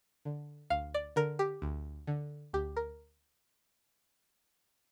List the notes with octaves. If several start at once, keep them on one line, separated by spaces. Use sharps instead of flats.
D3
D2 F5
D5
D3 A#4
G4
D2
D3
D2 G4
A#4